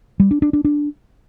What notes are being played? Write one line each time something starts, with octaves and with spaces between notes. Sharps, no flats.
G3
D4
D4
D4
D4